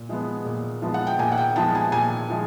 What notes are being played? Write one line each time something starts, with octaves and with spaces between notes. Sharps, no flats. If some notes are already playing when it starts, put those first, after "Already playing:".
Already playing: A#2
F3 G#3 B3
A#2
F3 G#3 B3
F#5
G5
A#2 G#5
F#5
G5
F3 G#3 B3 A5
G#5
A#2 G#5
F3 G#3